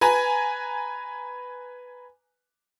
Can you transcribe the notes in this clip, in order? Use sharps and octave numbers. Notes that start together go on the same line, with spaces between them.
B4 G#5 A#5